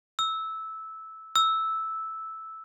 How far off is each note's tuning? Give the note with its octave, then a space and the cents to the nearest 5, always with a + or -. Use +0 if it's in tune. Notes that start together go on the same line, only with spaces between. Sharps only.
E6 -10
E6 -5